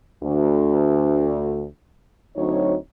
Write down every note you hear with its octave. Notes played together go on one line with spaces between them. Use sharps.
D2
D2 F#3 C4 D#4 C#5